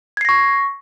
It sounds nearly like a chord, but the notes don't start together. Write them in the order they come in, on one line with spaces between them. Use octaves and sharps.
G#6 C7 A#6 C#6